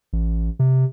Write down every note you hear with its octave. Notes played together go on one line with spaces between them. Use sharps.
A1
C3